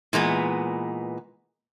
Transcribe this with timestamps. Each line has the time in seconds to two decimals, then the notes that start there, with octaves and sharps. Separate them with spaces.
0.13 A#2 E3 G#3 B3